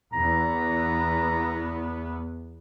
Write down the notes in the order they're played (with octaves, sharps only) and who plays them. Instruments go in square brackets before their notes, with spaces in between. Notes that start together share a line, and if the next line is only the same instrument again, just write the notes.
[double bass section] E2 B3 [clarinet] A#5